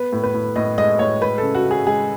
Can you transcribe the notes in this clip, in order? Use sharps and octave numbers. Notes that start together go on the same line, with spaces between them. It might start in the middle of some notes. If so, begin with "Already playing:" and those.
Already playing: B3 B4
A2
B4
A2
A2 D#5
G#3 D#5
A2 C#5
G#3 B4
C#3 A4
F#4
C#3
G#4
G#3 G#4